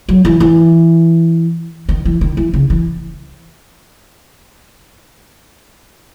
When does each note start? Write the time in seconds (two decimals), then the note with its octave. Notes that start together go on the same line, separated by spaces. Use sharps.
0.09 F#3
0.25 E3
0.40 E3
1.89 D#3
2.05 E3
2.21 D#3
2.37 E3
2.53 C#3
2.70 E3